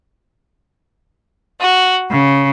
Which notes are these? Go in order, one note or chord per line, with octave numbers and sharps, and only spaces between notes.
F#4
C#3